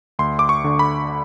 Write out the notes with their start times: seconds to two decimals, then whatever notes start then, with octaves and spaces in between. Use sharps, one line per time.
0.19 D2 C6
0.39 D6
0.49 C#6
0.64 D3
0.79 B5